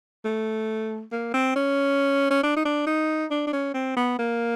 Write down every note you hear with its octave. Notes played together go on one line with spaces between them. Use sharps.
A3
A#3
C4
C#4
C#4
D4
D#4
D4
D#4
D4
D4
C#4
C4
B3
A#3